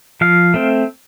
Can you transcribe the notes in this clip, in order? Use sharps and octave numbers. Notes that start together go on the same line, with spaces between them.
F3 F5
A3 C4